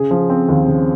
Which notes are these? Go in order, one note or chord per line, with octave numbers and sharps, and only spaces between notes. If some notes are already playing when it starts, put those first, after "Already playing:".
Already playing: C#3 G#4
F3
C4
D#2
C#3